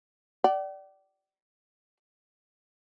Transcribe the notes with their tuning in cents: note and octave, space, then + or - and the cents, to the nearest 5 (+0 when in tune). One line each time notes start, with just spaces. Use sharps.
D5 +0 G5 -45